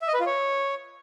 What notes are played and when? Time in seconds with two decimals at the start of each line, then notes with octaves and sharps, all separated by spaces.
0.02 E5
0.08 D#5
0.14 B4
0.20 F4
0.26 C#5